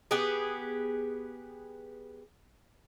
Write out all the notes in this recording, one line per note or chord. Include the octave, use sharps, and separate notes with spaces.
B3 G4 G#4